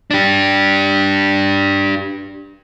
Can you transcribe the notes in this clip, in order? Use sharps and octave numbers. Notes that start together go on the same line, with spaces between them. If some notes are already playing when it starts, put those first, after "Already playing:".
D4 G4